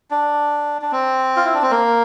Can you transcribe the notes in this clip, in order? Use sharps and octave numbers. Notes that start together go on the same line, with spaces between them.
D4
D4
C4
F4
E4
D4
C4
A#3